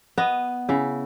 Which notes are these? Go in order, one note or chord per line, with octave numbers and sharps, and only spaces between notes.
B3 D#5
C#3 E4